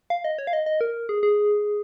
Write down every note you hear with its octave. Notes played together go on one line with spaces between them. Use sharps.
F5
D#5
C#5
F5
D#5
D#5
A#4
G#4
G#4